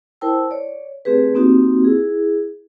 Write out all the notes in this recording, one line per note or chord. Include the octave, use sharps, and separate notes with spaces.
E4 A#4 C5 G5 A5 E6
C#5 D5
A3 C4 G4 G#4 B4
A#3 C4 D#4 F#4 G4
E4 G#4